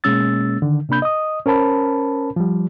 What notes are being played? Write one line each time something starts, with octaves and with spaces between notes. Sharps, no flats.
B2 G#3 A#3 C#4 E6 A6
D3 D#3
C3 A#3 D4 B5 G6
D#5 D#6
C#4 A#4 C5 A5 B5
F3 G3